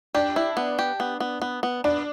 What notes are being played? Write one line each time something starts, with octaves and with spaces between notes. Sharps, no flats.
D4 G4
E4
B3
G4
B3
B3
B3
B3
B3 D4